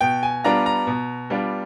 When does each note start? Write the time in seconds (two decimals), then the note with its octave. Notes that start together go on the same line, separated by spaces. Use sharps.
0.01 B2 G5
0.23 G#5
0.44 G3 B3 D4 F4 A#5
0.66 A#5
0.87 B2
1.30 G3 B3 D4 F4